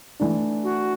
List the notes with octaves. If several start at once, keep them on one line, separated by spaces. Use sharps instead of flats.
E3 A3 D4
F#4